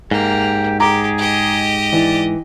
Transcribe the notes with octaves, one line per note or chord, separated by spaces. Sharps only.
G#2 A#3 G4
G4 G#4 A#5 D6
G4 D#5
E3 D5